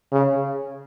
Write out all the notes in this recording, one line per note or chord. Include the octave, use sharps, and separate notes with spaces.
C#3